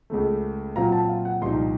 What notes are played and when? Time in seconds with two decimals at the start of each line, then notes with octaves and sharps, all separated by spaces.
0.10 C#2 C#3 A3
0.75 A#2 F#3 C4 F4 A#5
0.92 A5
1.09 F5
1.25 F#5
1.41 C2 A#2 F3 C4 D#4 C6